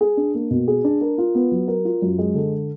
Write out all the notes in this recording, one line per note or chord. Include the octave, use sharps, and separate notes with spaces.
G#4
D4
A#3
B2
G#4
D4
A#4
F4
B3
F#3
A#4
F4
F#2
G#3
D3